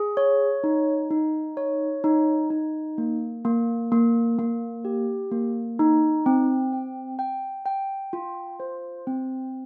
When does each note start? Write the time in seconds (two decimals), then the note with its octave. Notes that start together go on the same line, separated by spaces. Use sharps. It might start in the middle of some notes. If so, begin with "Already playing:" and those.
Already playing: G#4
0.17 C#5
0.64 D#4
1.11 D#4
1.57 C#5
2.04 D#4
2.50 D#4
2.98 A#3
3.45 A#3
3.92 A#3
4.39 A#3
4.85 G4
5.32 A#3
5.79 D#4
6.26 C4
6.73 G5
7.19 G5
7.66 G5
8.13 F4
8.60 C5
9.07 C4